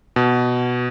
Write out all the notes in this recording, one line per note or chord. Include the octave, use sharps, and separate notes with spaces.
B2